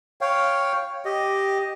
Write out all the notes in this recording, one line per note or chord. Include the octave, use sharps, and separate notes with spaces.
C#5 F5 G5
G4 D#5